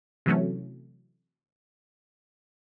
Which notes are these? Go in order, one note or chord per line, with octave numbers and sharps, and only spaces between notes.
C3 E3 F#3 A3 C#4